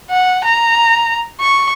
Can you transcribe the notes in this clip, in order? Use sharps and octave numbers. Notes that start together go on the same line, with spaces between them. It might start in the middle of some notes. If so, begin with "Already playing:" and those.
F#5
A#5
C#6